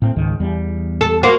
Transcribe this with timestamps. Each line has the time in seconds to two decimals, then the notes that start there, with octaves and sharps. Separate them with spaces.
0.02 A2 C4
0.16 C#2 G#2 D#3
0.40 E2 G3
1.01 A4
1.23 A#3 F#4 C5